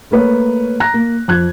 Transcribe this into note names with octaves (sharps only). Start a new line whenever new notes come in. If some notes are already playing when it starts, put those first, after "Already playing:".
A3 A#3 B4 C#5
A#5 F#6 A#6
A#3
F2 F#6 G#6